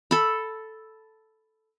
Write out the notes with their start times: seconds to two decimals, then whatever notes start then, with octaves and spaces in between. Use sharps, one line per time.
0.11 A4 B5